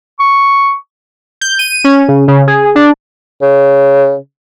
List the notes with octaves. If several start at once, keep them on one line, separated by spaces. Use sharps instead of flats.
C#6
G6
D#7
C#4
C#3
C#3
G#4
D4
C#3